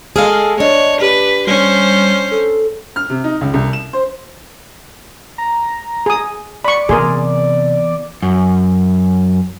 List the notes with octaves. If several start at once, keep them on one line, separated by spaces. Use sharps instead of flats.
G#3 G#4 A4 F5 F6
D4 C#5 D#5
G4 B4
G3 C#4 C5
A4
F6
C3
D#4
C#2
C2
E7
C5
A#5
G#4 D#6
D5 B5 C#6
E2 C3 A#3 G#4 A#4 C6
F#2